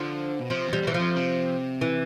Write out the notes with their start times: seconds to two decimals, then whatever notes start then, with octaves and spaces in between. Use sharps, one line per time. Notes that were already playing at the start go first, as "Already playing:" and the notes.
Already playing: D3 F3
0.40 B2
0.50 C3 F3
0.67 E2
0.73 G3
0.83 E2 E3
0.94 F3
0.99 F2
1.16 C3
1.81 E3